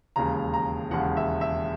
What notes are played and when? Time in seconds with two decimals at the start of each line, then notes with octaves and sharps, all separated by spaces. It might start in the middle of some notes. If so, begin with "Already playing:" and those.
0.16 E1 D#2 C#3 A#5
0.54 A#5
0.91 E1 D#2 C#3 F#5
1.17 E5
1.41 E5